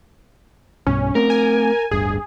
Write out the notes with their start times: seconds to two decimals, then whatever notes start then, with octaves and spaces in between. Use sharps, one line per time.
0.87 B1 G2 B2 C#4
1.15 A3 C4 A#4
1.30 G#5
1.91 D1 G1 G2 G#4